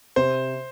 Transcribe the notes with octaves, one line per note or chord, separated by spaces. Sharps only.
C3 C5